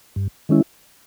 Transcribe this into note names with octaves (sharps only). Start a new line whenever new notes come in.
G2
D#3 G#3 C#4 E4